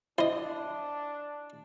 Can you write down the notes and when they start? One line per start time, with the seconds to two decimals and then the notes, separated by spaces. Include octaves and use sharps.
0.18 D4 E4 C5 D#5 E5